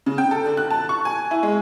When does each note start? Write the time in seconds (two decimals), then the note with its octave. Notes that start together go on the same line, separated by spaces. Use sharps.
0.06 C#3
0.18 G5
0.31 A4
0.45 D3
0.57 F#6
0.71 A5
0.89 C#6
1.05 G#5
1.31 E4
1.43 G#3